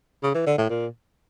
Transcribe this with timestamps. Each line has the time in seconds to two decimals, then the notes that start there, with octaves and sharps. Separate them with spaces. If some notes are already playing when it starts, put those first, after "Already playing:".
0.23 C#3
0.35 E3
0.46 D3
0.58 A2
0.70 A#2